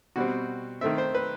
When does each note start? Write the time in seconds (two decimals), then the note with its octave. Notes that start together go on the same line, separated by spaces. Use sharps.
0.16 B2 G3 C4 F#4
0.81 D#3 A3 C4 E5
0.98 C5
1.15 B4